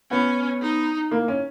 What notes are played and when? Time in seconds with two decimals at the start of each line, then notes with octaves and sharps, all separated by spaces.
0.11 B3 C#4
0.62 D#4
1.11 A#3
1.28 C#4